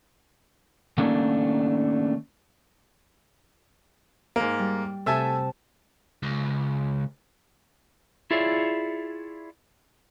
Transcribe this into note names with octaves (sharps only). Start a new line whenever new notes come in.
D#3 A3 A#3 C#4 D4
G#2 A#3
G3
C3 A3 E5 G#5 A5 E6
C#2
E4 F4 G#4 C#5 D5 E5